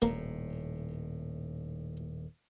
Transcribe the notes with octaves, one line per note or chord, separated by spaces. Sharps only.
D#1 A2 A#3